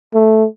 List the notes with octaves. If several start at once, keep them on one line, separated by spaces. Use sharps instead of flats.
A3